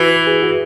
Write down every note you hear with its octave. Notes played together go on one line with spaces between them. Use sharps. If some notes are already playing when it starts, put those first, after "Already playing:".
Already playing: E3 F#4
G#4
F#4